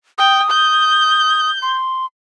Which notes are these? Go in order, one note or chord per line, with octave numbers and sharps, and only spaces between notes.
G5 D#6
G6
C6